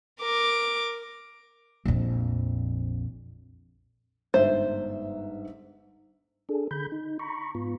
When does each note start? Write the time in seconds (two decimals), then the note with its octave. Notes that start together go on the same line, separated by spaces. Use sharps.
0.20 A#4 D6
1.85 A#1 F2
4.34 G1 G#2 C5 E5
6.49 D4 G#4 A4
6.71 D3 B5 G6
6.92 D#4
7.19 A#5 B5 C#6
7.55 G#2 B3 F4